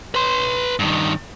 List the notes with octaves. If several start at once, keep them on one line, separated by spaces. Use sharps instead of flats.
B4 C6
G2 D#3